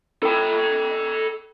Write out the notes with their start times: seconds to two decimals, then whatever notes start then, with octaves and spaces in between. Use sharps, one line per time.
0.23 A4 G5